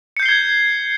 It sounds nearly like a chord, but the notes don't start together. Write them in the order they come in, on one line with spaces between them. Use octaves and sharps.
C#7 G6 C7 G7 G#6